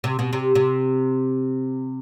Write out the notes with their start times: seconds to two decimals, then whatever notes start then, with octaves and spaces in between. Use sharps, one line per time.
0.04 C3
0.19 B2
0.33 C3
0.55 C3